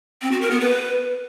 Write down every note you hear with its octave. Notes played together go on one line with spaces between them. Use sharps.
C4
F#4
A#4
B3
B4